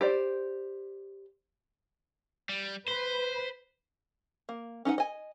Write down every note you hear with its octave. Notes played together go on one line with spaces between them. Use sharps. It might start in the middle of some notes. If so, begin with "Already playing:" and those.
G4 C5 D5
G3
B4 C5
A#3
C#4 D#4 B4 F#5
D#5 G#5